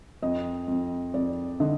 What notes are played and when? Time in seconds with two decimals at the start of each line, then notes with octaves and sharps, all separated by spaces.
0.22 F2 D#5
0.68 F2
1.14 F2 D5
1.60 D3 D#5